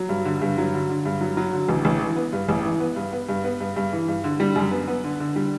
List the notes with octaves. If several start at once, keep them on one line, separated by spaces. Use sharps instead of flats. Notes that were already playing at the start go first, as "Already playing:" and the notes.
Already playing: F#3
G2
D3
G2
F#3
D3
D3
G2
F#3
F#3
D3
A1
A1
E3
B3
G2
A1
E3
B3
G2
B3
G2
B3
G2
G2
E3
G2
D3
G3
F#2
B3
B3
D3
D3
G3